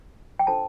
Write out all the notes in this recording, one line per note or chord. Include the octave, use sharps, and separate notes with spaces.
G5
D4 F4 A4 C5 A5